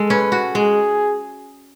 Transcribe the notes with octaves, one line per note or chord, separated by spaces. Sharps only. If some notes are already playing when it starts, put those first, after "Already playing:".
Already playing: G#3 A4
C#4 B4
F#4
G#3 G#4